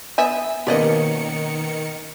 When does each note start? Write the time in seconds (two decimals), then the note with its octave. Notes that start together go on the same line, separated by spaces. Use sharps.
0.18 B3 E5 G#5
0.67 B2 D#3 A#3 C#4 G4 D5 D#5 C#7